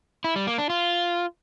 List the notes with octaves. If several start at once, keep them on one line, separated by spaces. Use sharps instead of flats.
E4
G3
A#3
D4
F4